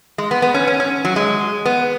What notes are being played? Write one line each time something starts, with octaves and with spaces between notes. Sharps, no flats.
G#3
B3
B3
C#4
C#4
C#4
F#3
G#3
B3